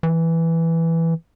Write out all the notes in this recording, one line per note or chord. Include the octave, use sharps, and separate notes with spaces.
E3